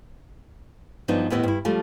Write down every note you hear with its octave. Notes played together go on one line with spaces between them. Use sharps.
G2 F3 F#3 B3 D4 D#4
D#2 A2 B3 E4 D5 D#5
G2 E4
F3 G3 A3 F4